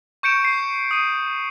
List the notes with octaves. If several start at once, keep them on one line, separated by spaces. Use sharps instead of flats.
C#6 G6 C#7 D7 E7
C7
D#6 D#7